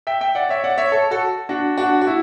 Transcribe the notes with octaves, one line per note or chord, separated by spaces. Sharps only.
E5 G5
E5 G5
D5 F#5
C#5 E5
D5 F#5
C#5 E5
A4 C#5
F#4 A4
D4 F#4
D4 F#4
F#4
E4